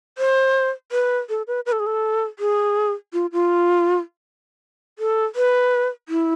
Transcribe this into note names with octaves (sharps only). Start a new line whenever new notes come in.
C5
B4
A4
B4
B4
A4
G#4
A4
G#4
F4
F4
A4
B4
E4